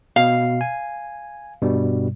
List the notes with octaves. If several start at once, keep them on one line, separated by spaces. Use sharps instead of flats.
B2 F5
G#5
G2 B2 G3